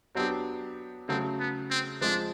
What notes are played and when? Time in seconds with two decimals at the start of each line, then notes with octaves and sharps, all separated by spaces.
0.15 F#3 B3 C4 D4 G4
1.09 C#3 F#3 A3 C4
1.40 B3
1.70 C4
2.01 F3 G#3 C4 D4